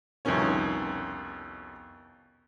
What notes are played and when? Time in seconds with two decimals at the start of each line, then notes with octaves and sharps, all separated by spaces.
0.25 C2 F2 B2 D#3 C#4 C#5